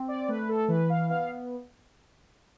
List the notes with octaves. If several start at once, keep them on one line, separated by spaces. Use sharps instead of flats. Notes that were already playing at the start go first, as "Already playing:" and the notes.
Already playing: C4
D5
A3 B4
A4
E3 B4
F5
B3 F5